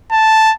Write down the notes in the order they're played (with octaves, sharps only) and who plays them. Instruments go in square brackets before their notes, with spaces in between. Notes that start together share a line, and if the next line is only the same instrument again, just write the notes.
[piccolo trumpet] A5